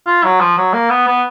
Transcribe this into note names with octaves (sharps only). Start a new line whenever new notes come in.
F4
F#3
F3
F#3
A#3
B3
B3